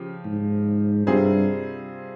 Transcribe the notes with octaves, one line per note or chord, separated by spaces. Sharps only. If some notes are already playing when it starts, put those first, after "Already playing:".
Already playing: C#3 F3 G4
G#2
G2 C3 G3 C4 F4 G#4